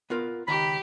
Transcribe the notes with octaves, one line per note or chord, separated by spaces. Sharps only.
B3 F4 A#4
C#2 D#3 G4 A#5 B5